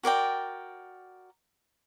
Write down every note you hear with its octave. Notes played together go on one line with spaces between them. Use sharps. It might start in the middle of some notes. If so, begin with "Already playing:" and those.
F#4 A#4 D5 G5